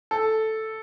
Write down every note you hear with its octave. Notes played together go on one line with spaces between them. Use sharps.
A4